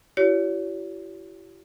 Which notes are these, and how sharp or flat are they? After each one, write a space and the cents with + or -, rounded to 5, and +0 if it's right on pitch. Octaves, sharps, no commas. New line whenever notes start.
E4 +40 G4 -35 C#5 +35